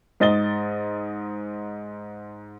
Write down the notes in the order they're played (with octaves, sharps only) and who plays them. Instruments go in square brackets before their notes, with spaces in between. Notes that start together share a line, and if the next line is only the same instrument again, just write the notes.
[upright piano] G#2 D#5 A6 G7